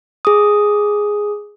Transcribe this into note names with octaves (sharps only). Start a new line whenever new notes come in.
G#4 D#6